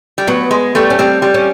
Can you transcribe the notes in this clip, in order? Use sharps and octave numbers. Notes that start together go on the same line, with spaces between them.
G3
F#3 B3
G#3
G3 A3
C#4
G3 C4
G3
C#4